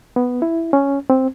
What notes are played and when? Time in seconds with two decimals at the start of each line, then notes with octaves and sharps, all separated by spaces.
0.16 B3
0.42 E4
0.73 C#4
1.10 C4